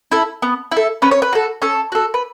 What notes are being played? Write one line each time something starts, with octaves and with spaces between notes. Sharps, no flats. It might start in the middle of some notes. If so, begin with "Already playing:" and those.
E4 A4
B3
E4
A4
C#4 B4
C#5
B4
F#4 A4
C#4 A4
F#4 A4
B4